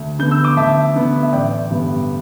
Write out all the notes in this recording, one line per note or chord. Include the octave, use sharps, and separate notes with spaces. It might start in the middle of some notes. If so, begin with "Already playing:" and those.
Already playing: D2
D3 B3 G6
E6
D6 G6
D2 E5 A5
D3 B3
E5
A1 D5 G5
G2 D3 G3 B3